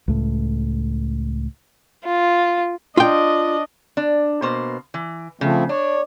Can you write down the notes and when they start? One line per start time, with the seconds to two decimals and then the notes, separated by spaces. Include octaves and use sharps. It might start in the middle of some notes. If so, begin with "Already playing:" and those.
0.08 C#2 A2
2.04 F4
2.97 D4 F4 D#5 G5
3.97 D4
4.42 B2 A#3 C5
4.94 E3
5.41 C#3 F3 A3 C4
5.69 D4 C#5